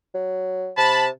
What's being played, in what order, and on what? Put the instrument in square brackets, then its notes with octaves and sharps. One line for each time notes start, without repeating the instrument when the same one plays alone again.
[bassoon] F#3
[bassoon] C3 [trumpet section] A5 B5